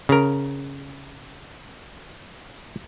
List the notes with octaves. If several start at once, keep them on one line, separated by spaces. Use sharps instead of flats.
C#3 A#4